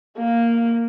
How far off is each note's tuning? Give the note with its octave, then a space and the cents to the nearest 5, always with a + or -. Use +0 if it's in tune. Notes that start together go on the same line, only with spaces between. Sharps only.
A#3 -5